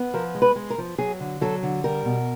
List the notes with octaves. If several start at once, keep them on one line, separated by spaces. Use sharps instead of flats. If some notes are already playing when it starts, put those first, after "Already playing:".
Already playing: B3
F3 A#4
G#3
B4
G#3
A#4
F3
F#3 G#4
D3
F#3 A4
D3
G3 A#4
B2